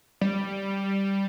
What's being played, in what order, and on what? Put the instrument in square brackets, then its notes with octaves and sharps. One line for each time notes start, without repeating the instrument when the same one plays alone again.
[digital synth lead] G3